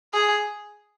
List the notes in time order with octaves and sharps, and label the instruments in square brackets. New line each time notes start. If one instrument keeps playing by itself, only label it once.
[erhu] G#4